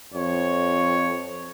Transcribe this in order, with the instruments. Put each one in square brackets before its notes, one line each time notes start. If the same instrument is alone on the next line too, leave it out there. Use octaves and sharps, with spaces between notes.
[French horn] F2 [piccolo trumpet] C#5